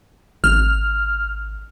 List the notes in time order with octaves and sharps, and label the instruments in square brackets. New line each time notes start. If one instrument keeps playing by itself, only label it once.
[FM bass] G#1 [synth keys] F6